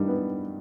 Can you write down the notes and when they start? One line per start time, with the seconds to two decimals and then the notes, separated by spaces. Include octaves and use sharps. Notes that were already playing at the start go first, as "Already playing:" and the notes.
Already playing: G2 D#3 G3
0.08 B3